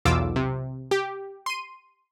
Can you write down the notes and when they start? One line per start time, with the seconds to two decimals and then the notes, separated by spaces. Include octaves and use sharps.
0.05 B1 E2 F4 D6 E6
0.36 C3
0.91 G4
1.46 C6 D#7